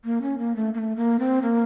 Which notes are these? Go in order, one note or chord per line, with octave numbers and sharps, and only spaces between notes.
A#3
C#4
A#3
A3
A#3
A3
A#3
C4
A#3